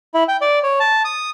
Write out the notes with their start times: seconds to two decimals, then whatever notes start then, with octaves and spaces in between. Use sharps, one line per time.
0.14 E4
0.28 G5
0.41 D5
0.63 C#5
0.80 A5
1.05 D#6